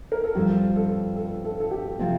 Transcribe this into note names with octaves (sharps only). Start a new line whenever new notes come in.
A#4
A4
G2 F3 C4 G4
A4
A4
A4
A4
G4
C3 F3 C4 F4